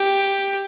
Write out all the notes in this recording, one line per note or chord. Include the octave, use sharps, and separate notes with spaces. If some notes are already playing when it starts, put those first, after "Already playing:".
Already playing: G4